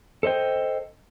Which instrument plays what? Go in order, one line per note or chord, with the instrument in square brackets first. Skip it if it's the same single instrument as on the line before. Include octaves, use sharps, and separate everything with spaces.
[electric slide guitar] A4 C5 D#5 G5